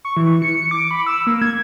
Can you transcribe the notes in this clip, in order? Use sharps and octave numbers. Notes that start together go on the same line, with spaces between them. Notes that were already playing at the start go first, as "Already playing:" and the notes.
C#6
E3
C#7
D6
B5
E6
A#3
G#6